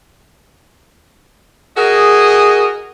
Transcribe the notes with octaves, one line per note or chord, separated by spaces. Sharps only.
F#4 G#4 A#4 D#5